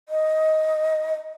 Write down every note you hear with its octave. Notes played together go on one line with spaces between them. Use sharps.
D#5